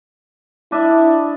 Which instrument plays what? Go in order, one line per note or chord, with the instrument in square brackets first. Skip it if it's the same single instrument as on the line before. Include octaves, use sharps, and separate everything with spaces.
[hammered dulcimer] D4 D#5 E5 [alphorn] E4